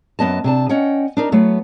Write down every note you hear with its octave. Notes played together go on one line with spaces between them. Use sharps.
F#2 B3 D#5 A5
C3 D4 A5
C#4 D#5 F#5 G5
D4 D#4 A#4
F#3 A3 B3